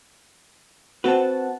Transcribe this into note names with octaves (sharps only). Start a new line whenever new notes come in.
C4 F#4 B4 F#5 A5